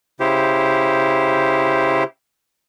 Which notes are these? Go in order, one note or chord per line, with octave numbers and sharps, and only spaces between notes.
C#3 E4 G4 C5